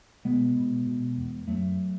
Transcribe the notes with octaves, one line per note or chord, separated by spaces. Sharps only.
B2 G#3 B3
B2
B2
E2
F#2 F#3 A3